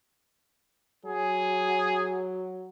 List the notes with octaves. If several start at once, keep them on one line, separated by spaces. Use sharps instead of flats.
F#3 G#4